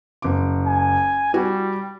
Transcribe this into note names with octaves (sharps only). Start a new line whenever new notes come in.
F#1 D6
G#5
G3 F#4